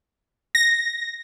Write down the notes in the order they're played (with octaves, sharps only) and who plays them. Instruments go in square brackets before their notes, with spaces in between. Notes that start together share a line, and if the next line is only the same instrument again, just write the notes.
[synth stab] A#6